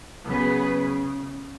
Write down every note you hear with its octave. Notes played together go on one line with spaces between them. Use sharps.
C#3 F#3 B3 G#4 B4